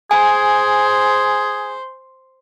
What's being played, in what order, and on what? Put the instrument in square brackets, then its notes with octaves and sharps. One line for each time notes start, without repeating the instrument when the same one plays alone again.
[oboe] G#4 [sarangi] C5 [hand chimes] G#5